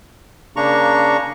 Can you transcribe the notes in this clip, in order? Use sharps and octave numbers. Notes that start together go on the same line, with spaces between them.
C#3 A#3 D4 A#5 C#6